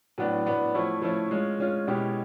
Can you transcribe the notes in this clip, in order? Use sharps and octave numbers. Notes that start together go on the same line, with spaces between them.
A2 F#3 B3 D4
A2 F#3 B3 D4
F3 A3 C#4 E4
F3 A3 C#4 E4
G#3 C#4 F4
G#3 C#4 F4
B2 G#3 C#4 E4 G4